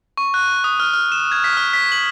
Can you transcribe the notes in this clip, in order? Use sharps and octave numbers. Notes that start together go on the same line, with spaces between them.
C#6
F#6
D#6
F6
F6
E7
G#6
B6
F6
B6
F#7